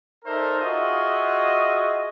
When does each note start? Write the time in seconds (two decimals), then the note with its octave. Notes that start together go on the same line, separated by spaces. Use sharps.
0.25 D#4 A4 A#4 C5 D5 E5
0.59 F4 F#4 G#4 D#5 E5